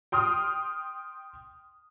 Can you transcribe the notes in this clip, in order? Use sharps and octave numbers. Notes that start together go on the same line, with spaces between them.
G5 C6 D#6 F6